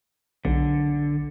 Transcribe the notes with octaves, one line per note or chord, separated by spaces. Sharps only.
B1 D3